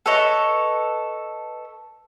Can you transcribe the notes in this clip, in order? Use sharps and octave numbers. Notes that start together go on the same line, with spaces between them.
A4 B4 C#5 D#5